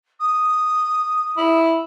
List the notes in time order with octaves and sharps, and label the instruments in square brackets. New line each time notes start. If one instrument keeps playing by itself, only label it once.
[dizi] D#6
[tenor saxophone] E4